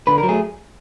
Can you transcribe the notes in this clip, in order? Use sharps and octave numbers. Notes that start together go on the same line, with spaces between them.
D3 B4
A#4
F#3
A3 G#4